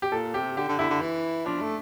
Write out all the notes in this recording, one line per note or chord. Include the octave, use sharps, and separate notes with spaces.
G4
A#2 A4
C3 G4
D3 G4
D3
D3 E4
D3
E3
F3 D4
A3